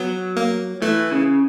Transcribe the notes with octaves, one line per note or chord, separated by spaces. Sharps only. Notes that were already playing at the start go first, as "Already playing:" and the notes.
Already playing: F#3 B3
A#3
E3 A3
C#3